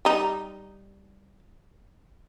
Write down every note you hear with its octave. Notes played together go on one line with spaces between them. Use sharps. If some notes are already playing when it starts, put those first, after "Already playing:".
G3 D#4